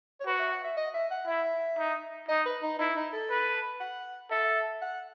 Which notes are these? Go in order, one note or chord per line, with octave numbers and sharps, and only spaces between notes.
C#5
F#4 B4
E5
F#5
E5
D#5
E5
F#5
E4 E5
D#4
D#4 D#5
B4
D#4
D#4 E4
D#4
A4
B4
F#5
A4 E5
F#5